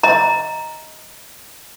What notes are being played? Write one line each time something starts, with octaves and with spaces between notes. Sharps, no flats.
D#5 A#5